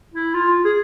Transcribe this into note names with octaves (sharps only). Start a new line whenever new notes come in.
E4
F4
G#4